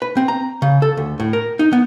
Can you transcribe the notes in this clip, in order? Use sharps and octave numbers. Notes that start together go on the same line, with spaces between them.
B4
C4
A#5
C#3
A4
D2
A2
A#4
D#4
B3